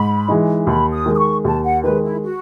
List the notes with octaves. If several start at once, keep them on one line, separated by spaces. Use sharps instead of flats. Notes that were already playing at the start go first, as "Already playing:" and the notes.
Already playing: G#2 B5
E3 G#3 D#4
D#2 B5
D#6
D#3 G#3
D#6
C#6
D#2 A5
F#5
D#3 G#3 B4
E4
F#4